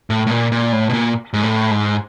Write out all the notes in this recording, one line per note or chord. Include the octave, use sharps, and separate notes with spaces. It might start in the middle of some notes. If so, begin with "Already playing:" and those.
A2
A2
A#2
A#2
A2
B2
A#2
G#2
A2
G#2